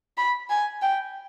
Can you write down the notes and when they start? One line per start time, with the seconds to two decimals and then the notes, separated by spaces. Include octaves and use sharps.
0.17 B5
0.50 G#5
0.82 G5